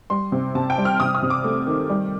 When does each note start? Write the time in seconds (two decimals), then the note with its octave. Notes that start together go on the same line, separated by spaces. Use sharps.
0.10 G3 C6
0.32 C3
0.55 C3 A5
0.70 G5
0.78 G3
0.85 F6
1.00 C3 D#6
1.15 D#6
1.22 C3
1.30 D6
1.44 A3
1.67 D#3
1.89 G3